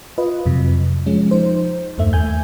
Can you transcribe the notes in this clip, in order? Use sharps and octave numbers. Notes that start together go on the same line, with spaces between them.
F4 B4 D#5
F2 C3 F#3
F3 G#3 C#4
F3 D#4 C5
E2 G2 A3 E5
D#2 A3 G#5 G6